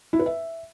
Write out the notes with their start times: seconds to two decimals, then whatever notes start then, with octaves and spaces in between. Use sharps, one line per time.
0.13 E4
0.19 B4
0.26 E5